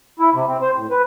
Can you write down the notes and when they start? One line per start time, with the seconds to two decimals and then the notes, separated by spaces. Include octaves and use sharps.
0.19 E4
0.34 C3
0.48 C4
0.62 C5
0.76 A2
0.90 B4